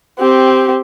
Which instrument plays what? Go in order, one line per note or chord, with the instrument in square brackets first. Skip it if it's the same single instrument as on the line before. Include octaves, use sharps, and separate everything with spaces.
[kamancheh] C4 G4